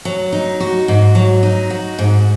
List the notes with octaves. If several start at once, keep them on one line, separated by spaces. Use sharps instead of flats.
F#3
D#4
F#4
G#2
F#3
D#4
F#4
G#2